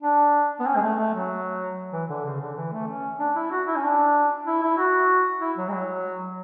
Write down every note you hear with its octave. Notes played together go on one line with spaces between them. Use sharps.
D4
B3
C#4
G#3
A3
A3
F#3
E3
D3
C#3
D3
E3
A3
C#4
D4
E4
F#4
E4
C#4
D4
E4
E4
F#4
E4
F#3
G#3
F#3